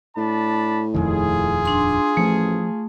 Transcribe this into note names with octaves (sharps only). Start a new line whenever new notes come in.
A2 D4 A5 B5
D#1 F2 D#3 F4 G#4
D4 C6
A1 F3 A3